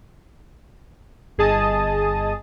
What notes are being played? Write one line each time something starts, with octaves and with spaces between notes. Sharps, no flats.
G1 G#4 D#5 A5 D#6